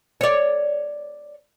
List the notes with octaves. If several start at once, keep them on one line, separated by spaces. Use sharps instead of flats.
C#5 D5